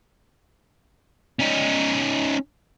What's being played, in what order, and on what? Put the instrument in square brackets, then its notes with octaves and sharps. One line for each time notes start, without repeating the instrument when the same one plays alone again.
[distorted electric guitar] C#4 D#4